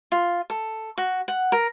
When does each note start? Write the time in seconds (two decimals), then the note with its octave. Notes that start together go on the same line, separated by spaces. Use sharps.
0.12 F4
0.50 A4
0.98 F#4
1.28 F#5
1.52 A#4